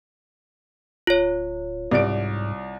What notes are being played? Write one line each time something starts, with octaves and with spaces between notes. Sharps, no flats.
D1 F4 C#5
C2 G#2 D5 D7